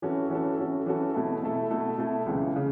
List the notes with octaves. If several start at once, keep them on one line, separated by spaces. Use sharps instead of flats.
E3 C#4 F#4 A4
E3 C#4 F#4 A4
E3 C#4 F#4 A4
E3 C#4 F#4 A4
B2 A3 E4 A4
B2 A3 E4 A4
B2 A3 E4 A4
B2 A3 E4 A4
C#2 C#3 E3
C#3